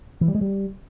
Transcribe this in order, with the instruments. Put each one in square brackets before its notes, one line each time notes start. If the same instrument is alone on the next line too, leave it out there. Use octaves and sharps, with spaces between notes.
[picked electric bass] E3
G3
G#3
G3